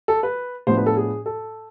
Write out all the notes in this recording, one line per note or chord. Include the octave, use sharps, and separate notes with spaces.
A4
B4
A2 F3 B3 D4 C5
B4
A4
G#4
A4